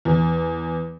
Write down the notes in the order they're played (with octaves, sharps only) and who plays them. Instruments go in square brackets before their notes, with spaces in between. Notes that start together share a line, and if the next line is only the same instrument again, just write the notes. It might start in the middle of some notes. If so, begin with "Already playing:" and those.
[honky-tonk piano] E2